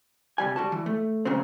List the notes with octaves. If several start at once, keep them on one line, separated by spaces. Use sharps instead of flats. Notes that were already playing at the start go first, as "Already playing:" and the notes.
C3 G3 G#5
G3 F#4 A5
E3
A3
A#2 C#3 F#3 C4